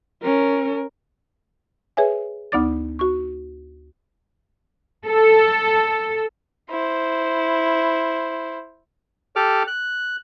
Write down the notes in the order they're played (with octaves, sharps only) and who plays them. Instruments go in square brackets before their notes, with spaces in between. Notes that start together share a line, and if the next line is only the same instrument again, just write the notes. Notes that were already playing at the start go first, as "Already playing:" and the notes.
[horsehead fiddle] C#4 A#4
[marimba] G#4 B4 C#5 E5 G#5
D2 B3 D#4 D5 D6 A6
F#4 C#6
[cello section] A4
[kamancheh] E4 C5
[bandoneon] G4 A4 D6 F6
F#6